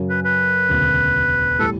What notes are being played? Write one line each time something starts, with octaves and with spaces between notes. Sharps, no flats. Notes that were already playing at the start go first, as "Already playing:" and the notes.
Already playing: F#2 C#3 F#3 C#4
B4
B4
E1 D2 C#3
A2 E3 G3 A4